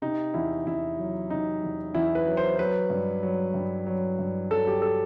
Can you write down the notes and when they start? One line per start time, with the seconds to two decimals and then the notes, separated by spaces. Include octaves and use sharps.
0.02 C3 D#4
0.34 E2 E4
0.66 E2 E4
0.98 F#3
1.30 C3 D#4
1.63 E2
1.94 E2 E4
2.15 B4
2.26 F#3
2.37 C5
2.59 F#3 B4
2.90 G2
3.23 F#3
3.54 G2
3.87 F#3
4.19 G2
4.51 F#3 A4
4.67 G4
4.82 A4